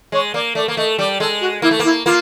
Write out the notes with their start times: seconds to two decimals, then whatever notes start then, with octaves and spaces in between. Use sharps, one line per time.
0.12 G#3 C#5
0.34 A#3 D5
0.55 A3 D5
0.68 A#3
0.77 A3 D#5
0.98 G3 D5
1.20 G#3 A4
1.41 F#4
1.62 A#3 E4
1.71 A3
1.79 A#3 E4
2.06 A#3 F4